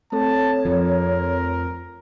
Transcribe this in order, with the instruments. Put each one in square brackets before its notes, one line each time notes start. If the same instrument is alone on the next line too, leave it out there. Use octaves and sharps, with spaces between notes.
[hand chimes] A3 C4 A4 [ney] C#5 [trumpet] A5
[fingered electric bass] F2 F3 [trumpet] A#4